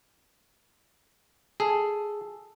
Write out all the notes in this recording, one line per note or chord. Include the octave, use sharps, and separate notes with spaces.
G#4 A4